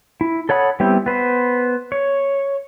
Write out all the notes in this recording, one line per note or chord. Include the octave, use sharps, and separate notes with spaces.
E4
A4 C#5 F#5 B5 D#6
G3 B3 C4 E4 G4
B3 B4 C5
C#5